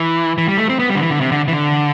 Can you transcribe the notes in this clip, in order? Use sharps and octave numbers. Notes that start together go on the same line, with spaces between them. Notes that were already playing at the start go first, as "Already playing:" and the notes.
Already playing: E3
E3
G3
A3
C4
B3
G3
D3
E3
D3
C3
D3
E3
D3